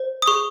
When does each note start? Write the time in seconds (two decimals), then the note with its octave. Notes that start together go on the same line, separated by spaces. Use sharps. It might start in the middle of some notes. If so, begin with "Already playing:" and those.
Already playing: C5
0.22 D#6
0.27 G#4 C#6